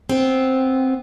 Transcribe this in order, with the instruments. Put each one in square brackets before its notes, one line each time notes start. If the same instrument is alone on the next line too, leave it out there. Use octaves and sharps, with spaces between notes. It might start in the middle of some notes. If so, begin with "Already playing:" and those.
[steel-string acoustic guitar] B3 C4